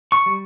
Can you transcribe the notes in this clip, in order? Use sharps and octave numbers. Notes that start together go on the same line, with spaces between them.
C#6
G3